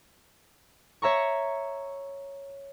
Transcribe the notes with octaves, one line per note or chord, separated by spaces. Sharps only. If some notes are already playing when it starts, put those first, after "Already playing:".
C#5 E5 A#5 C#6